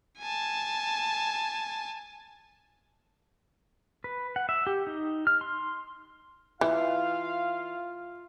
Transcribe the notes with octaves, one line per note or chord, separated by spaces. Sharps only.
G#5 A5
B4
F#5
E5
G4
D#4
F6
C6
E3 F4 E5 F5